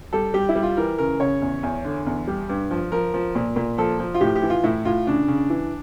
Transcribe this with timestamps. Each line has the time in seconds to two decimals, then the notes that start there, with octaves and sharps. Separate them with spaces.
0.13 G3 A4
0.34 G3 G4
0.49 E4
0.55 G3
0.63 F4
0.77 E3 A#4
0.98 C#3 A#4
1.20 C#3 C#5
1.42 E2
1.63 E2
1.84 D3
2.06 E2
2.27 G3
2.49 G2
2.71 F3
2.92 F3 A#4
3.14 F3
3.35 A#2
3.56 A#2
3.78 F3 A4
3.99 F3
4.14 F4
4.21 A2 G4
4.35 G4
4.43 E3
4.50 F4
4.64 A2 E4
4.85 A2 F4
5.07 C#3 D4
5.28 C#3
5.50 E3